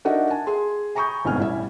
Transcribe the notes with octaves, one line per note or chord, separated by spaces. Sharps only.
D4 D#4 F#4 A#4 E5 F#5
G#5 A5
G#4 C6
G#5 A#5 B5 C#6 D#6 G6
G1 G#2 B2 C4 G#5 F6
A1 G3 E4 E5